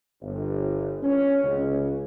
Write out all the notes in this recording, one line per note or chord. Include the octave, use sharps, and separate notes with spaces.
G1
C#4
C#2